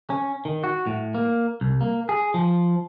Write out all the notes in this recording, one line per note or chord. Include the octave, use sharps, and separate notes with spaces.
C#4
D#3
F#4
A2
A#3
C2
A#3
G#4
F3